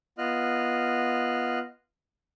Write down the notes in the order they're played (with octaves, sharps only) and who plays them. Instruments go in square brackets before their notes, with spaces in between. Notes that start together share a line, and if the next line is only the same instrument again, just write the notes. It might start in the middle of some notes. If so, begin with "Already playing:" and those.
[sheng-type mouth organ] B3 F4 D#5 F6 F#6